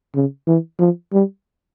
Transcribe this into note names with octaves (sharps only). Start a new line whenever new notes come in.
C#3
E3
F3
G3